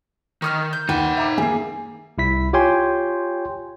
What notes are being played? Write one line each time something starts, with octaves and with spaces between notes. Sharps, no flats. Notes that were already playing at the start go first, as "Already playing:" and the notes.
D#3 C#6 D#6 F6
G6
D#2 D#4 B4 F#5 G5
E5 A#5 D6
D#3 A#3 G#4 C7
C2 E4 B6
F4 G4 C#5 G5 G#5 C6